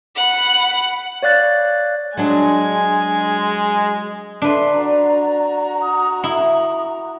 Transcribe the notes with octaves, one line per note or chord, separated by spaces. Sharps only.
F#5 B5
C#5 D5 F5 F#6 A6
F#3 G#3 D4 G#5
D4 B4 E5 C6
F#4 D5 A#5
D#6
E4 D#6